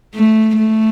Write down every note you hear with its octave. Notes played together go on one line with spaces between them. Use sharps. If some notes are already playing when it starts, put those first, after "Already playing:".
A3
A3